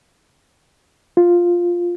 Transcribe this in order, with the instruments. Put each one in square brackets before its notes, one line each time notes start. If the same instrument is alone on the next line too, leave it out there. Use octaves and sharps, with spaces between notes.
[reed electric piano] F4